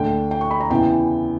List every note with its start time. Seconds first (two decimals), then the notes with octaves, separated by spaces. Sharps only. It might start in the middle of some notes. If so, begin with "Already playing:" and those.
Already playing: D2 D3 G5
0.31 G5
0.41 C#6
0.51 B5
0.60 A#5
0.70 E2 C#3 E3 G5